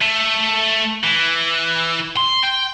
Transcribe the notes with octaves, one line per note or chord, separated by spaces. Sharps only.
A3
E3
C6
G5